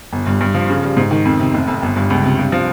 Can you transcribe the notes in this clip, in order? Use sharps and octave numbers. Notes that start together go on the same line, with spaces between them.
G1
G2
G2
F3
C#3
G3
G#2
D#3
F2
C3
F1
F2
G1
G2
C#2
C3
G2
F3